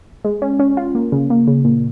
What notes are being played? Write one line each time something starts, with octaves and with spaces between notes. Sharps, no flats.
G#3
C#4
C#4
F4
A#3
C#3
A#3
C#3
A#2